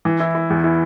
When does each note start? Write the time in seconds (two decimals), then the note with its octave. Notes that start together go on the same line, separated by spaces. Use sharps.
0.05 E3
0.20 E4
0.35 E4
0.50 E2
0.64 E4